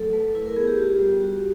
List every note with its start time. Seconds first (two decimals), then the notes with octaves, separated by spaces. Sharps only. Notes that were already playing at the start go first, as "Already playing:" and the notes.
Already playing: F#3 A3 A4
0.13 A3 B4
0.35 E4 B4
0.46 A#4
0.56 B3 G#4
0.67 G4
0.78 F4 G4
0.99 G3
1.21 F#4